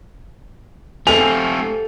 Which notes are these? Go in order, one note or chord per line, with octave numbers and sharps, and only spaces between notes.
A3 C4 G4 A4 F5 G#5 F7